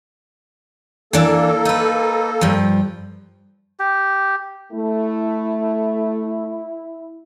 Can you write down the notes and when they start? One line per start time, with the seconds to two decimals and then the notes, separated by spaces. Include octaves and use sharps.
1.13 E3 A#3 D4 A4
1.65 D#4 B4
2.41 G2 F3
3.79 G4
4.72 A3 E4